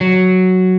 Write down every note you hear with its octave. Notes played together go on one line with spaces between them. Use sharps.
F#3